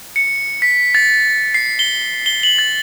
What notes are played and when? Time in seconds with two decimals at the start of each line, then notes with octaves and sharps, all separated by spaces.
0.16 C#7
0.62 B6
0.95 A6
1.54 C7
1.79 G7
2.26 G7
2.43 F#7
2.59 A6